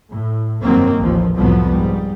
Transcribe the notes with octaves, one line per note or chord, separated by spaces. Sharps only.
A2
F1 G2 D#3 F#3 A#3 C4
A1 D#2 F3
C2 F2 A2 F3 F#3 B3
G#2 G3